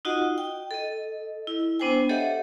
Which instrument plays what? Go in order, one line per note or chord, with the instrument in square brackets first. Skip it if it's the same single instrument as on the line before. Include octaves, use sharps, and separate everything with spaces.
[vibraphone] D#4 F4 F#4 D#5 F#5
G5
A4 D#5
E4
B3 D4 C5 G5 G#5
G4 A4 C#5 D#5 E5 F#5